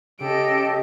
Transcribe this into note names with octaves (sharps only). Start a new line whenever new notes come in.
C#3 G4 A4 D#5 D7